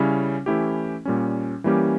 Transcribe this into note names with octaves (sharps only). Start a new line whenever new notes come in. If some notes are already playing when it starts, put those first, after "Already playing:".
Already playing: C#3 G3 C#4 E4
E3 A3 C#4 E4 G4
A#2 G3 C#4
E3 G3 A#3 C#4 G4